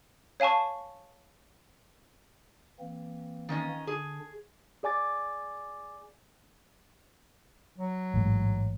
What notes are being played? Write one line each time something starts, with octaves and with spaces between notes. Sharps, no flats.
C#5 F5 G#5 A5 C#6
E3 A#3 C4
D#3 C#4 D#5
D3 D4 G#4
G#4 D5 G#5 D6 A6
F#3
A1 G#2